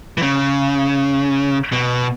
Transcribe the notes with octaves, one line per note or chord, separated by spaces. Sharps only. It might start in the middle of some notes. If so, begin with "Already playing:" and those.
E3
C#3
B2